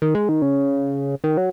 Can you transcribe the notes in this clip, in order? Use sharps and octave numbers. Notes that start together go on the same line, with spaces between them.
D#3
G#3
D#3
C#3
D#3
F#3